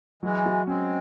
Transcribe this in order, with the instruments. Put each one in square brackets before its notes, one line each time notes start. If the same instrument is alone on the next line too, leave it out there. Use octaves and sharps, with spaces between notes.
[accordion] E3 G#3 [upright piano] F#3
[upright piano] F#4
[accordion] G#3 C4 [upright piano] C#4